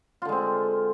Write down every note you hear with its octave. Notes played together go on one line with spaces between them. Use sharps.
D3 G#3 C4 F4